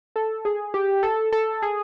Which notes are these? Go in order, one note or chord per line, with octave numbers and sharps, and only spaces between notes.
A4
G#4
G4
A4
A4
G#4